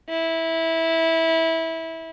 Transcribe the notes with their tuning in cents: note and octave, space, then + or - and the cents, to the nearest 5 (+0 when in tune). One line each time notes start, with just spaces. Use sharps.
E4 -15